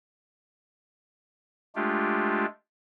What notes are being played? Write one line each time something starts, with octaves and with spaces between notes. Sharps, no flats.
G#3 A3 D4 F4 G4